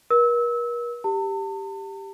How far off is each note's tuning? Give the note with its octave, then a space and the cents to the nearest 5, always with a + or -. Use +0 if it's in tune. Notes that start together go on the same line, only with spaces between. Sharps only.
A#4 +40 E6 -25
G4 +0 A5 +40